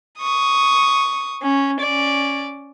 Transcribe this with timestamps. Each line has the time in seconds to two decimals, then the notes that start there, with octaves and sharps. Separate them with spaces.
0.20 C#6 D#6
1.42 C#4
1.80 C#4 D5